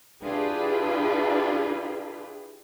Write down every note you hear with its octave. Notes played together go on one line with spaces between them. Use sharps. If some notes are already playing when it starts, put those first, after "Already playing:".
D4 E4 F4 G4 G#4 B4